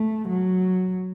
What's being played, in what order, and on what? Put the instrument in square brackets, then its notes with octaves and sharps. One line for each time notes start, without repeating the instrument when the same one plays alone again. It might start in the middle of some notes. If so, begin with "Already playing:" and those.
Already playing: [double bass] A3
F#3